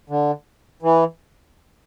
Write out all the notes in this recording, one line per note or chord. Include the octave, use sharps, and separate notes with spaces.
D3
E3